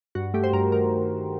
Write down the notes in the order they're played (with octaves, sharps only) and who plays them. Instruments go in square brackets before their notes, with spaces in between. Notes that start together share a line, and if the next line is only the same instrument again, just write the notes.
[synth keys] G2 F#4
A3 G4
C5
G2 A#4
D#3 A#4